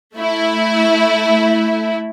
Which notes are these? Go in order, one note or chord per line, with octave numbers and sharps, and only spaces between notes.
A3 E4